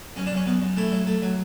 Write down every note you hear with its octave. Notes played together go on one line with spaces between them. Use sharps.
F#2 C#4
D4
F#2 C#4
F#2 B3
F#2
A3 E4
F#3
A3
F#3